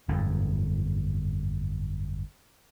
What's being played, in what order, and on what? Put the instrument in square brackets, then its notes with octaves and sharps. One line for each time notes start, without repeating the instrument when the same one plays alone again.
[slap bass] G1 F2 G#2